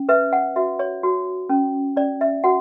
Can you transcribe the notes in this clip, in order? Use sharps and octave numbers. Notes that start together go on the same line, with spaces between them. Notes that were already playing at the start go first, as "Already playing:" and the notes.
Already playing: C#4
B4 E5
F#5
F#4 E5
C#5
F#4
C#4
C#4 D5
E5
F#4 F#5